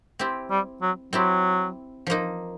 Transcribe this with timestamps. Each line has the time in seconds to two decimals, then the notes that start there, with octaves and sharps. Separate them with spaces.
0.19 C4 E4 G4
0.51 G3
0.81 F#3
1.13 F#3 C4 E4 G4
2.07 F3 A#3 D#4